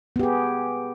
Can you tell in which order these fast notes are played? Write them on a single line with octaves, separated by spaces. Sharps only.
B3 G4 G#4